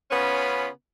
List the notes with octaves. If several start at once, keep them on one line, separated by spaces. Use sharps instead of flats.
C#3 B3 C#4 F4 B5